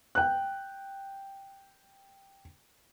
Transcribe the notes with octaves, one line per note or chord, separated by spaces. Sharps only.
G5 F#6